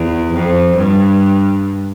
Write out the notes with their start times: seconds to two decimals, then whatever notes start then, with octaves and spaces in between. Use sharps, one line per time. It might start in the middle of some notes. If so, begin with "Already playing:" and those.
Already playing: E2
0.33 F2
0.76 G2